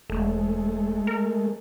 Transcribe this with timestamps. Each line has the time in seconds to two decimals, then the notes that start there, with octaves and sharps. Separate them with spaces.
0.10 E1 G#3 A3
1.07 A#4